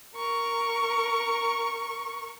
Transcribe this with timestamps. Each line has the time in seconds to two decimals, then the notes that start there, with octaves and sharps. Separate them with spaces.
0.15 A#4 C#6